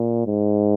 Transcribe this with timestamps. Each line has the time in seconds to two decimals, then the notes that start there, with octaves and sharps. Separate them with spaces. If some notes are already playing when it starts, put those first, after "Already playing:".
Already playing: A#2
0.26 G#2